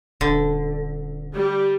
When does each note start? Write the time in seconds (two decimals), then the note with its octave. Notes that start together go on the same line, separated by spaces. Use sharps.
0.21 D#1 D3
1.35 G3